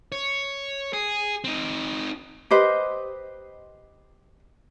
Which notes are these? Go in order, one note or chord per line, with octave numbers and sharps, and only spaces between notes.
C#5
G#4
C4 D#4
G4 B4 C5 D#5